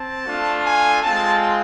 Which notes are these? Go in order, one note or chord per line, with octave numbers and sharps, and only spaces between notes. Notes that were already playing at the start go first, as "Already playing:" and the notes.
Already playing: C4 A5
A3 D4 F4
G#5
G#3 C4 F4 A5